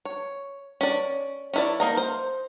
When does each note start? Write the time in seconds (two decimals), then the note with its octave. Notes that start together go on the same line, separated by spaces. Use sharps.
0.05 C#5
0.81 C#4 D5
1.54 C#4 E4 D5
1.80 A#3 D#4 A#4
1.97 C5